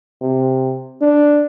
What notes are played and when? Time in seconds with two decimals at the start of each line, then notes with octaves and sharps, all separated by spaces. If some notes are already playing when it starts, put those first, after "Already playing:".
0.21 C3
1.01 D4